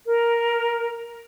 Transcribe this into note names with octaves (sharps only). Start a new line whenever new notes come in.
A#4